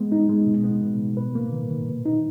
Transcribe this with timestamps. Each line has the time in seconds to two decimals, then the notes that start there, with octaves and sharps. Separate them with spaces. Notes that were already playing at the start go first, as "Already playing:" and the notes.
Already playing: G#3 B3
0.12 D#4
0.29 G#3
0.47 B2
0.64 B3
0.81 B2
0.99 B2
1.17 B4
1.35 A#3
1.52 D#3
1.70 D#3
1.89 A#2
2.05 D#4